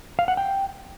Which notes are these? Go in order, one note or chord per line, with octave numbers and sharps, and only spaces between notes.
F5
F#5
G5